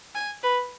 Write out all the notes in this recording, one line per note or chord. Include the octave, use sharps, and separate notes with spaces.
G#5
B4